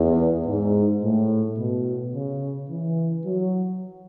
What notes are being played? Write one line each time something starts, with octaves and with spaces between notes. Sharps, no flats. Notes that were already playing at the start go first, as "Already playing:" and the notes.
Already playing: E2
G#2
A2
B2
C#3
E3
F#3